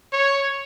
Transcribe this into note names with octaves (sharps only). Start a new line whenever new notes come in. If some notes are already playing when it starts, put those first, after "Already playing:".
C#5